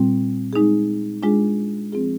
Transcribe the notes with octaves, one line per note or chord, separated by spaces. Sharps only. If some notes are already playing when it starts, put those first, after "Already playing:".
Already playing: A#2 G3 C4 F4
G#3 D#4 G#4
G#3 D4 F4 G#4
F3 C4 F4 G#4